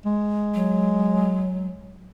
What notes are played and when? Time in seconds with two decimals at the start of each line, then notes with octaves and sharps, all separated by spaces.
0.06 G#3
0.54 F#3